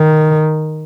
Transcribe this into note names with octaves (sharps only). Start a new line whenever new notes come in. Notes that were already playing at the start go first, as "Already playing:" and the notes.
Already playing: D#3